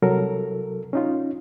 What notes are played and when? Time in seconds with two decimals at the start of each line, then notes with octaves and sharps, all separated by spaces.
0.02 C2 C3 F#3 A4 A#4
0.93 C#4 D#4 F4